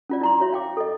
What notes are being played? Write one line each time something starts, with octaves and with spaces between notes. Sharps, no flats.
C#4 F4 D5
E4 A#5 C6
F#4 C#5 E5
F5 G5 D6
A4 D#5